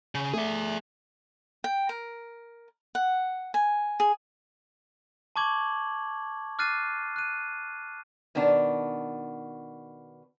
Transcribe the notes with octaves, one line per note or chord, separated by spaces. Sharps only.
C#3
A3 G#4 E5 D6
G5
A#4
F#5
G#5
G#4
A5 C#6 D6 G#6 F#7 G7
D6 F6 F#6 A6 C7 D#7
F#6 D#7
B2 D#3 B3 D4 A5